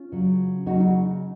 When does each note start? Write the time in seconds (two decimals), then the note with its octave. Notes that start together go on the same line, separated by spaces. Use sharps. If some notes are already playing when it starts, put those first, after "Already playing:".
Already playing: C#4 F4
0.12 C#3 F#3
0.66 C#3 F#3 D#4 F#4
0.80 D#4